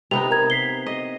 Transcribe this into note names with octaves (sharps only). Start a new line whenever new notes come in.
C3 B3 D#4 F7
A#4 A#5 G#6
B6 C7 G7
D#5